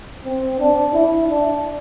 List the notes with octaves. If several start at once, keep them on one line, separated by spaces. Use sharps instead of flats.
C4
D4
E4
D4